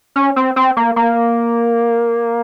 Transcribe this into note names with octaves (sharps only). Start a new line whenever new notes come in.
C#4
C4
C4
A#3
A#3